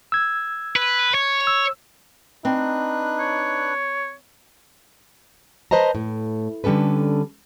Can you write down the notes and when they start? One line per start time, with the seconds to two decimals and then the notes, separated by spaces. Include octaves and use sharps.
0.12 E6 G#6
0.76 B4
1.14 C#5
1.47 E6
2.45 C4 D4 D#4 B4 F#6
3.20 C#5
5.71 B4 C5 D#5 A5 A#5
5.95 A2
6.64 D3 G3 C#4 A4 B4